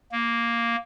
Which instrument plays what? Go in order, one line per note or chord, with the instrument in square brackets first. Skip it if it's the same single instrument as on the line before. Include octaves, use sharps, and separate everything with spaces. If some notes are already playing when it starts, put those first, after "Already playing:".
[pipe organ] A#3